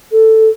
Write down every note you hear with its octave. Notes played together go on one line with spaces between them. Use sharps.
A4